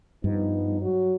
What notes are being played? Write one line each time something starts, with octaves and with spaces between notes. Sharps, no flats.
G2 F3 B3 D#4
F#3